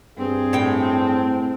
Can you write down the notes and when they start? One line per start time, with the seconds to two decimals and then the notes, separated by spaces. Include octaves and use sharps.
0.18 G2 C4 G#4
0.53 A2 G5